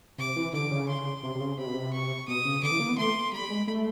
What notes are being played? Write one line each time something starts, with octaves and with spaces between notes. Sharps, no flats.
C3 D6
E3
D3 D6
C#3
C6
C3
C3
C#3
C3 B5
B2
C3
C#6
B2 D#6
C#3
D3 D6
E3
A#3
B3
A3 C6
G3 B5
G#3
A3